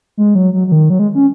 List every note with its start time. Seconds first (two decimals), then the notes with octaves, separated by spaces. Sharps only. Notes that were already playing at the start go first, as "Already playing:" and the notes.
0.17 G#3
0.35 F#3
0.53 F#3
0.67 F#3
0.72 D#3
0.90 F#3
0.99 G#3
1.15 C#4